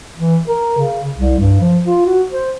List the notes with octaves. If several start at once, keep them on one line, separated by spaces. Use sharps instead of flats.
E3
A#4
C#3
C2
G2
F3
F4
F#4
C5